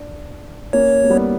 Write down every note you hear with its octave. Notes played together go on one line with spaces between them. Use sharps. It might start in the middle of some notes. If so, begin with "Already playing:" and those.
Already playing: D4
A#3 C#4 C#5
A#3
G3 B3